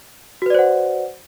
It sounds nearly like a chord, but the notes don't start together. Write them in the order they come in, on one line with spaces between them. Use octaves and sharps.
F#4 B4 D5 C5 F#5